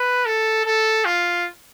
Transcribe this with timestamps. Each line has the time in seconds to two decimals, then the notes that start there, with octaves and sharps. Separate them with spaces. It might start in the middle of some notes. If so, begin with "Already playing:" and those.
Already playing: B4
0.25 A4
0.65 A4
1.05 F4